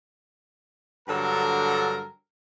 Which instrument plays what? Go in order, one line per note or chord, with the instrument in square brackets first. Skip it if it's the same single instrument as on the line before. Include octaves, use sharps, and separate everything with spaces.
[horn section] G2 D3 F#3 A4 A#4